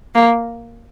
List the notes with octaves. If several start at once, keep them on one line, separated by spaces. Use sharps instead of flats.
A#3